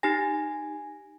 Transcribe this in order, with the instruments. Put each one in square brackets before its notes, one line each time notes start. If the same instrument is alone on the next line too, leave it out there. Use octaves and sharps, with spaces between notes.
[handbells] D#4 G4 A#6 [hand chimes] G#5